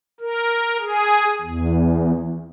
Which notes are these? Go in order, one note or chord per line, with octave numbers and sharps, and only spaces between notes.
A#4
G#4
E2